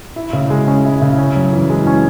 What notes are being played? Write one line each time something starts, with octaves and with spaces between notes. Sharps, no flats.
E4
C#3
G#3
C#4
E4
C#3
C#4
F#2
E3
G#3
C#4